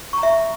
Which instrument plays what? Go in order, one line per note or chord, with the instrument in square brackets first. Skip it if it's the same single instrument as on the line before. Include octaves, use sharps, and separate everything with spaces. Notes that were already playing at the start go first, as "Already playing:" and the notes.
[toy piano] C#6
A#5
E5